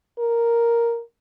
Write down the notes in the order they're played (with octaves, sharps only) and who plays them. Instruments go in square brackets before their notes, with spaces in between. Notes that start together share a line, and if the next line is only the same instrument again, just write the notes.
[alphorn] A#4